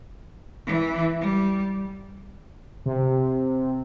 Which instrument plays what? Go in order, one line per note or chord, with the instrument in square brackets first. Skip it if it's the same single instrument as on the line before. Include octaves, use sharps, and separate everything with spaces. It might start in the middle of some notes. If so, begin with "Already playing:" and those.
[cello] E3
G3
[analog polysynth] C3